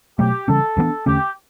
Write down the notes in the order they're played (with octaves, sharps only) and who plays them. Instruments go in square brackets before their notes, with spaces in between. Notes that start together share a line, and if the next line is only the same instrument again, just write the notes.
[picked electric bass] B2 F#3 A3 [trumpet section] G4
[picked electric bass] C#3 E3 G3 C#4 [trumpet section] A4
[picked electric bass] G2 E3 B3 D4
[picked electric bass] E2 D3 A3 C#4 [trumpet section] G4